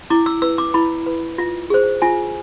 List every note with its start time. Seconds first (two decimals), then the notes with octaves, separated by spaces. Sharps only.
0.10 E4 D6
0.26 E6
0.42 B4 E6
0.58 D6
0.74 E4 B5
1.07 B4
1.38 F4
1.70 G#4 C5
2.02 F4 G#5